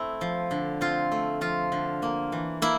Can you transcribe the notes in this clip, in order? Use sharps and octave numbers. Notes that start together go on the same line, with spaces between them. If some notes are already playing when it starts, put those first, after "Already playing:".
Already playing: A3 C4 E4
F3
D3
C4 F4
A3
F3 F4
D3
A#3
E3
A#3 E4